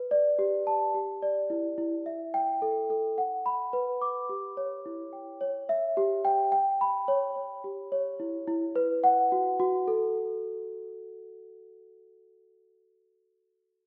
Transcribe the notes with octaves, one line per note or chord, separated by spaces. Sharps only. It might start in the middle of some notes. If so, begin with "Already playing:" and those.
Already playing: B4
D5
G4
A5
G4
D5
E4
E4
E5
G5
A4
A4
F#5
B5
B4
D6
G4
C#5
E4
G5
C#5
E5
G4
G5
G5
B5
C#5
C#5
G4
C#5
E4
E4
B4
F#5
F#4
F#4
A4